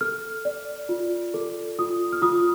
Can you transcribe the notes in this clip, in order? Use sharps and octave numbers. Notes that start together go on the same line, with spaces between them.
A4 F6
D5
F4
A4
F4 D#6
F6
F4 D#6